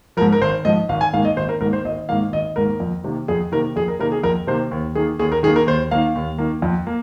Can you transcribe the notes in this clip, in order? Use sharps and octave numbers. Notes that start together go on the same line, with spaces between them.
G#2 F3 A#4
A#4
G#1 C5
G#2 F3 D#5
G#1 F5
G#5
G#2 D#3 A#3 F5
D#5
G#1 C5
A#4
G#2 D#3 A#3 A#4
C5
G#1 D#5
G#2 D#3 A#3 F5
G#1 D#5
G#2 D#3 A#3 A#4
F2
C3 D#3 A#3
F2 G#4
C3 D#3 A#3 A#4
F2 G#4
A#4
C3 D#3 A#3 A#4
G#4
F2 A#4
C3 D#3 A#3 C5
D#2
D#3 A#3 G#4
D#2 G#4
A#4
D#3 A#3 G#4
A#4
D#2 C5
D#3 A#3 F5
D#2
D#3 A#3
F2
A#3